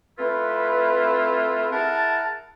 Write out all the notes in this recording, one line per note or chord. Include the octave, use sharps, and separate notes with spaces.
A3 C4 E4 F4 B4
E4 G#4 A#4 F#5 A5